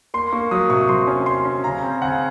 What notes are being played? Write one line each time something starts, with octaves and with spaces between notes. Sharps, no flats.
A#3 C6
A#3 C#6
F#3 D#6
C3 C#6
F#3 C6
C#4
C#4 C6
C#4
C#3 A#5
C4
C#3 F#5